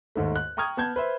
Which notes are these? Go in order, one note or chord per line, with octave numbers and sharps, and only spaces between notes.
D#2 G#2 A3
F#6
G5 A#5 C#6 D#6 F6 G#6
B3 A5 G6 G#6
B4 C5 E5